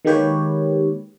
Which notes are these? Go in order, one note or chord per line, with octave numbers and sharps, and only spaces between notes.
D#3 G#3 A#3 G4 B4 C#5